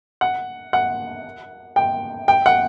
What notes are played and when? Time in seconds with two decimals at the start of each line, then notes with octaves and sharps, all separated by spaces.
0.21 F#5
0.73 F#5
1.76 G5
2.28 G5
2.46 F#5